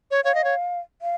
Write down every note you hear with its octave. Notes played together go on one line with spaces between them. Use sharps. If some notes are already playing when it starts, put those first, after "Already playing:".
C#5
C#5 F5
D#5
C#5
F5